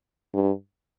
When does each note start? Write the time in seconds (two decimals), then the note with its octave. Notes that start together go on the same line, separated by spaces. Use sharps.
0.34 G2